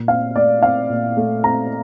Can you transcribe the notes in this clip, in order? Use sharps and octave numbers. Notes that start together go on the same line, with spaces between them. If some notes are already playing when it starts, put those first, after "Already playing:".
Already playing: A#2
C4 F5
A3 D5
C4 F5
A#2
A3
C4 A#5